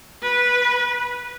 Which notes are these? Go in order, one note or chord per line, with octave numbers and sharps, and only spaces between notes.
B4